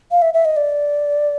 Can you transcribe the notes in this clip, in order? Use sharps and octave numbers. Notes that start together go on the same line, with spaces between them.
F5
E5
E5
D#5
D5